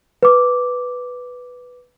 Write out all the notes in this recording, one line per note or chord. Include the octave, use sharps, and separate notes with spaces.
B4 D6